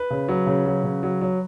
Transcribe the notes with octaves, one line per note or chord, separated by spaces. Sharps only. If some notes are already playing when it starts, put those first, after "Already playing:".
Already playing: B4
C#3
F#3
C#3
F#3
C#3
F#3
F#3